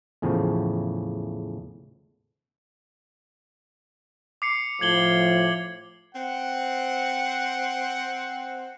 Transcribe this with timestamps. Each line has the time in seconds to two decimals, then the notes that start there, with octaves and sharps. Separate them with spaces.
0.22 E2 A2 C#3 F3
4.42 D6 C7 C#7
4.81 A2 F3 G#6 F#7 G7
6.15 C4 F#5